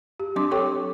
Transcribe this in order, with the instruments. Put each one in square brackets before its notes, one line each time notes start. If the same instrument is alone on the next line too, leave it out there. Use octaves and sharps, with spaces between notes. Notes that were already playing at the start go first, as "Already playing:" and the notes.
[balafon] G4
F#3 C4 D4 C6 D6
G4 A4 C#5 G5 C#6 D6